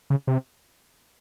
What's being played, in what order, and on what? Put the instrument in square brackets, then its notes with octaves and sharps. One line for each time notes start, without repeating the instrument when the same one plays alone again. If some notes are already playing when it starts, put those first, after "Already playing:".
[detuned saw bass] C#3
C3